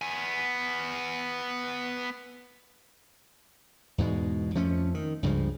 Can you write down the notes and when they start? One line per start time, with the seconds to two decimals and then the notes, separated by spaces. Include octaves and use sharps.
0.02 B3 G#5
3.98 E2 G#2 B2 G#3
4.55 F2 F3 A3 C#4
4.94 D#3
5.23 C#2 G2 C#3 F3